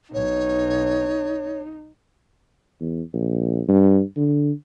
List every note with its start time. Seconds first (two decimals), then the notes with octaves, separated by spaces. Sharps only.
0.14 B1 D#4 C#5
2.80 E2
3.13 A#1
3.68 G2
4.17 D3